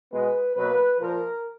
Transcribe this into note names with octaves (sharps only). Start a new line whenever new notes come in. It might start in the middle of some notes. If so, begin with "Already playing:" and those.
B2 G#3 B3 B4
B2 F#3 A#3 B4
A#2 F3 A#3 A#4